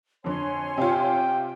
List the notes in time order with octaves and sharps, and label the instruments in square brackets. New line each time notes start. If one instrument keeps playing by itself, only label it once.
[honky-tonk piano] F2 D3 [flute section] C#5 G#5 C6
[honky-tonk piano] C3 F4 [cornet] G5